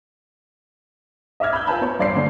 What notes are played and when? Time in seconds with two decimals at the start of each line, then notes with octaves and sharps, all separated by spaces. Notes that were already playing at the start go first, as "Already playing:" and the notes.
1.40 D#5 E5 D6 F6 G#6
1.53 B5 E6 G6
1.67 F4 A#4 B4 G#5 A5 B5
1.81 B3 C5 C#5
1.99 G2 D5 C6 C7
2.15 D3 A3 A#3 C#4 A4